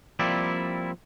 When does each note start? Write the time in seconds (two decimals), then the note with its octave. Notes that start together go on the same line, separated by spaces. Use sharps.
0.19 F3 G3 A#3 C4 E4 D5